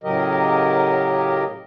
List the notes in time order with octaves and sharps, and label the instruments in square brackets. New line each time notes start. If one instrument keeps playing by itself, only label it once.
[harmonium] A2 C#3 F#3 G4 A#4 D#5